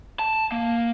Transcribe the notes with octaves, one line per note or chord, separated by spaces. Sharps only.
A5
A#3